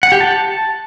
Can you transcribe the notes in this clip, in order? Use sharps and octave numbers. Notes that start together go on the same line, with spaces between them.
F#5
G4
A5